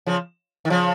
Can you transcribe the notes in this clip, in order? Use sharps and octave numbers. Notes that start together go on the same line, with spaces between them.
C#3 F3
D#3
C#3 F3